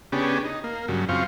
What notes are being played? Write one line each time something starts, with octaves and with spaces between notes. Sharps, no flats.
C#3 B3 C#4 D4 G4 G#4
D#4
A#3
G2 C#3 F#3
F#2 C#3 C4 F4 F5 C#6